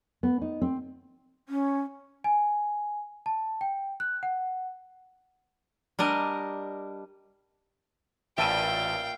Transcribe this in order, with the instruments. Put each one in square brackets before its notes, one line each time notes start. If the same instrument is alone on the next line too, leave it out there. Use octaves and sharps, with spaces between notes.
[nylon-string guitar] B3
D#4
C4
[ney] C#4
[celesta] G#5
A5
G5
F#6
F#5
[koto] G3 D4 A#4 D#5
[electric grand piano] A1 A5 D#7 [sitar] A#2 E5 [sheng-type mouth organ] F5 [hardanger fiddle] G5